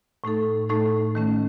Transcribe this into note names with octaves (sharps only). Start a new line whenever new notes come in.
A2 A3 D#4 A4
A2 A3 D#4 A4
D#3 A3 C#4